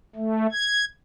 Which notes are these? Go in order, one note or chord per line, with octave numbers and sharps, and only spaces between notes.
A3
G#6